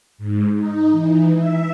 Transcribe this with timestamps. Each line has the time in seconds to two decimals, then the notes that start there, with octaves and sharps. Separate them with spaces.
0.18 G#2
0.57 D#4
0.91 E3
1.37 E5